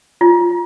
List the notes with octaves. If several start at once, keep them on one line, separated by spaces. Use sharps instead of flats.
F4